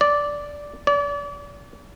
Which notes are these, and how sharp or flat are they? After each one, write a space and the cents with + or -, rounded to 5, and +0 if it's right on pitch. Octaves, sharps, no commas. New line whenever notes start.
D5 -10
D5 -40